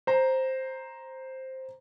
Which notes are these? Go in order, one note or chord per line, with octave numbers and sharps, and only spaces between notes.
C5 A#5